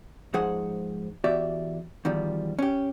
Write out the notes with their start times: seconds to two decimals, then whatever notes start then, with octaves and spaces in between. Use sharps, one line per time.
0.34 G#2 F3 G#4 C5 F#5
1.24 E2 F#4 G4 D5 E5
2.05 E2 D#3 F3 G3
2.59 C#4 G4